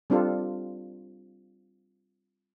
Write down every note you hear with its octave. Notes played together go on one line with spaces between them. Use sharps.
G3 C4 D4 F4 A4